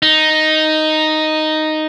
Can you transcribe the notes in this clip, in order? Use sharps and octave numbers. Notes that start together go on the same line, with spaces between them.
D#4